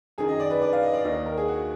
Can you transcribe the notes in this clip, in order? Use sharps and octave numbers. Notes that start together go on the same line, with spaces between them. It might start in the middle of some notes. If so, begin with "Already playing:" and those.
F#2 D#3 G#4
D#5
D5
B4
D5
F5
D#5
D5
D#2 D#3 D#5
A#4
G#4
F#4